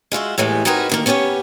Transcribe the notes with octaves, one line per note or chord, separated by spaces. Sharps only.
G#3 F4 F#4 E5
D#2 A2 E3 G#3 A3
C4 D#4 F#4 G#4 A#4 B4
D2 D#3 A#3
B3 C#4 G4 A4 C#5